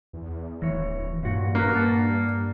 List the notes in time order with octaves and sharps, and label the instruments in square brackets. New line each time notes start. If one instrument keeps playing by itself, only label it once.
[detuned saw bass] E2
[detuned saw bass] D1 [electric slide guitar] E3 C#5
[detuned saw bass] G2 [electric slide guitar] A#2 F#4
[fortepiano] A#3 [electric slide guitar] F#4 B4
[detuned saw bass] G2 [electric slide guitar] D5 F#5 A5